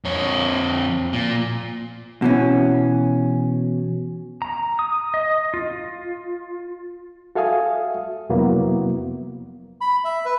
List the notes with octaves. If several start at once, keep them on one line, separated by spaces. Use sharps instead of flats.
F2 C#5
A#2
B2 E3 C#4
A#5
D#6
D#5
F4
F#4 A4 E5 F5 G#5 D#6
F2 C3 F#3 A#3 B3 E4
B5
E5
B4